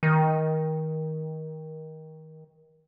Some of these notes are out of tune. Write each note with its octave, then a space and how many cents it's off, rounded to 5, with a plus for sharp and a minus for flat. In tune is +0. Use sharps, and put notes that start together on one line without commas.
D#3 +20